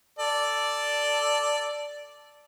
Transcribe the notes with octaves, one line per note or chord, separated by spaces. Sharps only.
A4 D5